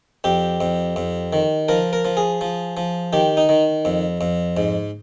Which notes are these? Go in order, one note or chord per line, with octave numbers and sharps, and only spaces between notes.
F2 G4
F2
F2
D#3
F3 A#4
A#4
F3
G#4
F3
F3
D#3 G4
D#4
D#3
F2
F2
G#2